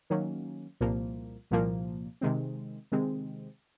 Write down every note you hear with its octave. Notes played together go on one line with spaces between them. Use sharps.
D#3 F#3 A#3 C#4
C2 A#2 F3 A#3
C2 A#2 F3 A#3
C3 D#3 G#3 C4
C3 D#3 G#3 C4